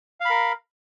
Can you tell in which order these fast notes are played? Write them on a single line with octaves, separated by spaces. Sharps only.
F5 B5 A#4